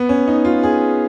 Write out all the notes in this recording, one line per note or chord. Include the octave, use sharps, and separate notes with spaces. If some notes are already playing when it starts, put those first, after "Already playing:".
Already playing: B3
C#4
D#4
F4
G#4